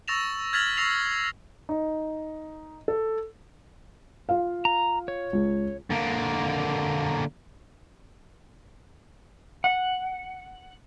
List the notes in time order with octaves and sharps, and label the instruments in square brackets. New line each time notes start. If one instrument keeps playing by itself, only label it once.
[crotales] C#6 E6 A6 A#6 E7 F7
F6 G#6 A6 B6 F7 F#7
C#6 E6 A#6 C7 F7
[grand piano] D#4
A4
[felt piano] F4 F5
[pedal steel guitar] A#5
C#5
[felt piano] C#2
[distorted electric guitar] D3 A#3
[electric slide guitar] F#5